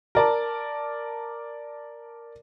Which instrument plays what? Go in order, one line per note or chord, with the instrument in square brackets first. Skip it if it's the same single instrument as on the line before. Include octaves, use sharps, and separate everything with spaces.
[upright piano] A#4 D5 A5